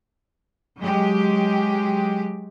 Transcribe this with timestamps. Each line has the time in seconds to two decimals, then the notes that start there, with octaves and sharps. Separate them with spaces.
0.79 F#3 G#3 G4